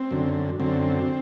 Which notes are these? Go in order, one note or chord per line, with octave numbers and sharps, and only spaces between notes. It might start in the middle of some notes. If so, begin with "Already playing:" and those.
Already playing: C4
F#2 D3
F#2 D3 C4